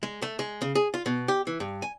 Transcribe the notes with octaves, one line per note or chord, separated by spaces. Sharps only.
G#3
A3
G#3
C#3
G#4
F4
B2
G4
E3
G2
G#5